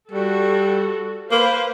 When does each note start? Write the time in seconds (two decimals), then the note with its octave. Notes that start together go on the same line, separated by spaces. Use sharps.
0.11 G3 F#4 A4
1.31 A#3 B4 C5 F5